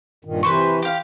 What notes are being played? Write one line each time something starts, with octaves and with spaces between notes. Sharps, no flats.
G2 A#2 D#3
C3 E3 B4 C5 C#6
G4 F5